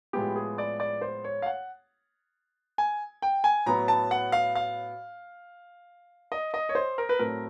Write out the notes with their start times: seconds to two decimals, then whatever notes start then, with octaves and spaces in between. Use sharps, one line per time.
0.13 A2 F3 G#3 B3 G4
0.36 G#4
0.58 D5
0.80 D5
1.01 C5
1.24 C#5
1.42 F5
1.46 F#5
2.78 G#5
3.22 G5
3.44 G#5
3.66 A2 F#3 B3 A#5
3.88 A5
4.11 F#5
4.32 F5
4.55 F5
6.32 D#5
6.54 D#5
6.69 C#5
6.75 C5
6.98 A#4
7.09 B4
7.19 A2 F#3 A3 C4 A#4